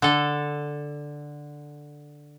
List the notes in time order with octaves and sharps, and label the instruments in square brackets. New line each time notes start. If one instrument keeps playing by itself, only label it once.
[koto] D3 A4